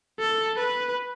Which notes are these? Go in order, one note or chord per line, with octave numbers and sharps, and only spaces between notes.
A4
B4